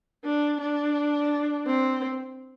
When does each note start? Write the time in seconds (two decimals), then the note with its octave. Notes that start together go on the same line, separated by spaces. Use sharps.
0.25 D4
0.60 D4
1.66 C4